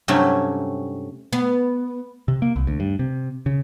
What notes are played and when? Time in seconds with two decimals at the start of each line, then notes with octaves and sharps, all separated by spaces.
0.08 G2 C3 F#3 A3 C#4 E4
1.33 B3
2.28 C3
2.42 A#3
2.56 C2
2.67 D2
2.80 G2
2.99 C3
3.46 C#3